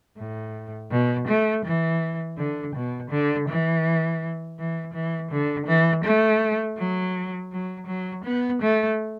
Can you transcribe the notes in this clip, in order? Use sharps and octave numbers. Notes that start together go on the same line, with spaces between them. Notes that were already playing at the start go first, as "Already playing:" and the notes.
A2
B2
A3
E3
D3
B2
D3
E3
E3
E3
D3
E3
A3
F#3
F#3
F#3
B3
A3